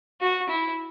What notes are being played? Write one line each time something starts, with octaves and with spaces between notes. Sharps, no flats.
F#4
E4